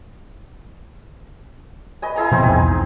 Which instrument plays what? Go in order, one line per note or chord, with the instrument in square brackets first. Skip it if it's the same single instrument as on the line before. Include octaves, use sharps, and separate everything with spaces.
[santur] B4 D#5 G#5
E4 G#4 A#5
[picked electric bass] B2 F3 [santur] C4 D#4 G#5
[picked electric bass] B1 E2 G#2